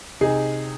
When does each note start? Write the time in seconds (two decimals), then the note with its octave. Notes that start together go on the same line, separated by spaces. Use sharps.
0.21 C3 D#4 G#4